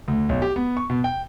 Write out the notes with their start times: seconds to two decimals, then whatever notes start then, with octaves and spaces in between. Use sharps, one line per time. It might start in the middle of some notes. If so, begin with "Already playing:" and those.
0.08 D2
0.29 B1
0.42 G4
0.56 B3
0.77 C#6
0.90 B2
1.04 G5